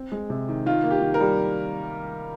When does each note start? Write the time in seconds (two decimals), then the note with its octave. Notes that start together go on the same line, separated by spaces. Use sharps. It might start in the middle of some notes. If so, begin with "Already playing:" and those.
Already playing: C4
0.12 G#3
0.30 C3
0.48 D#3
0.66 D#3 F4
0.84 A#3
0.91 G4
1.02 D#3
1.14 A#4
1.20 G3